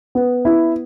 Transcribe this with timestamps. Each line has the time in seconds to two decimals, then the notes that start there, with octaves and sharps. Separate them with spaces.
0.15 B3
0.45 E4